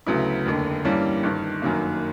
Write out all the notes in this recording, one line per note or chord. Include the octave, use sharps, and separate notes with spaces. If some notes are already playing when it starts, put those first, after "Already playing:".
D2 C#3 F#3 B3 E4
F1 D#2 D3
G2 E3 G3 A#3 C#4
G1 G2 D#3
G1 F#2 D#3 F#3 A#3